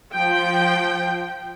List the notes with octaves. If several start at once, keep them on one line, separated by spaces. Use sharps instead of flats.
F3 G5